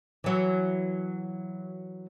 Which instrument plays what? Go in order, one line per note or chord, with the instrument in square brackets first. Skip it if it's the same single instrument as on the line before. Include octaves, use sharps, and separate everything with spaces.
[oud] E3 F#3